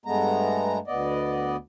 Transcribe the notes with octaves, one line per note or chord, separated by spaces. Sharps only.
G2 G#3 A3 B3 A#5
D2 B3 D5 D#5